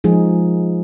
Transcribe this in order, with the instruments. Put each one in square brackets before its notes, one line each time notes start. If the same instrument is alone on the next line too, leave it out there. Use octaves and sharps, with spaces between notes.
[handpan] F3 G#3 D#4 G#4